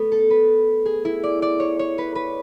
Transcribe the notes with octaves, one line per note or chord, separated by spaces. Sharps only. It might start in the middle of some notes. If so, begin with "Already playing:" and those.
Already playing: A3 B3
A4
B4
G#4
E4
D5
D5
C#5
C#5
B4
B4